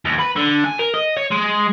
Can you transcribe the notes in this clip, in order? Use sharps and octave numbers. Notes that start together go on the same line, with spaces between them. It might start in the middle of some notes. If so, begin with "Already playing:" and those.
D#2
B4
D3
G#5
A#4
D#5
C#5
G#3